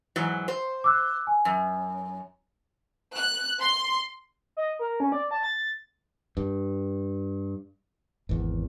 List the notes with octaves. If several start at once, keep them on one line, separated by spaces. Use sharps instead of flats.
G#2 E3 F#3
C5
D6 E6 F#6
G#5
F#2
F#6
C6
D#5
A#4
C#4
D5
A5
A6
G2
G#1 E2